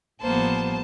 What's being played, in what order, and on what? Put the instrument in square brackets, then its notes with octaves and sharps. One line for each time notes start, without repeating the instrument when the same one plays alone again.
[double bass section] A1 F3 G3 [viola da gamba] A#3 B3 [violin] C5 A5